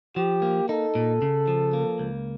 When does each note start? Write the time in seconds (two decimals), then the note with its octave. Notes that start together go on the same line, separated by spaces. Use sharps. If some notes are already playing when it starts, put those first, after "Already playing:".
0.16 F3 G4
0.42 A#3
0.69 D#4 A4
0.95 A#2
1.22 C#3
1.48 F3
1.73 A#3
1.99 C#2